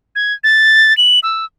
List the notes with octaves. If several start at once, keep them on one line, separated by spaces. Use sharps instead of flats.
G#6
A6
F#7
E6